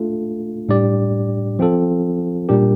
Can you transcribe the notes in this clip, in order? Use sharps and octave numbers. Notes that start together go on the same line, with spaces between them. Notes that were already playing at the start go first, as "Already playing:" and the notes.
Already playing: A3 D4 F4 A4
A2 G3 D4 G4 D5
F3 C4 F4 A4
A#2 G3 D4 G4 A#4